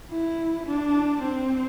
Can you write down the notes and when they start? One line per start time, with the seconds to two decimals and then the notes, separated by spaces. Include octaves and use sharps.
0.11 E4
0.67 D4
1.22 C4